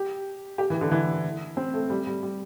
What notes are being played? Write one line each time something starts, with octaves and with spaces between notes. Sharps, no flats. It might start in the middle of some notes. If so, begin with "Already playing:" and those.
Already playing: G4
G4
E3
D3
E3
C4
A3
G3
G3
G3